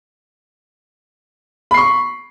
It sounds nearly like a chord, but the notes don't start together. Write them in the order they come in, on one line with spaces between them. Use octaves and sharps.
B5 C7 C#6